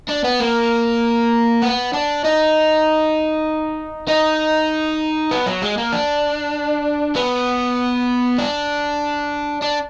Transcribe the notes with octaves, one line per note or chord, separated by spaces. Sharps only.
D4
B3
A#3
B3
D4
D#4
D#4
B3
F#3
G#3
A#3
D4
B3
D4
D4